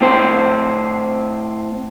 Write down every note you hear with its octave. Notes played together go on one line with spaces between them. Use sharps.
A2 C4 C5